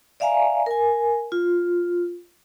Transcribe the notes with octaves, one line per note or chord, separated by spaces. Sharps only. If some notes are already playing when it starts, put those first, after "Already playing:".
D5 E5 F5 G#5 A#5
A#4 G#5
F4